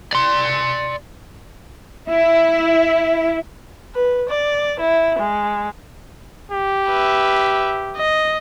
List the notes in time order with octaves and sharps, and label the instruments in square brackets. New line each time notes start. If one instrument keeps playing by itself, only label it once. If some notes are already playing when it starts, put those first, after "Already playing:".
[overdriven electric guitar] D5 C6
[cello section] E4
[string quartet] B4
D5
E4
G#3
[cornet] G4
[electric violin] B4 E5
D#5